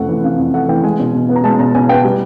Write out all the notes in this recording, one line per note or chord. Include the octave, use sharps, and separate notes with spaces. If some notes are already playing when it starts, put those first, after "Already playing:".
Already playing: F2 C3 A3 F#5
E3
C3 F5
F2
A3 F#5
E3 G5
G#3 G#5
B2
B2
B3
A#5
G#3 A5
B2 A#5
B2 G#5
B3 G5
G3